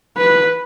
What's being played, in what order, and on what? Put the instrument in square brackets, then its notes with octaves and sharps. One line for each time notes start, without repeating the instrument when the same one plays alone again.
[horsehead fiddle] B4